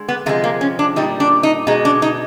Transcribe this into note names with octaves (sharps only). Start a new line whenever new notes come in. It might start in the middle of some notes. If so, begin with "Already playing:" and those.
Already playing: D3 G#3
B3
C3 F3 G#3 A3
A#3
C#4
D4
A#2 G3 D#4
D4
D#4
B2 G#3 D#4
D4
D#4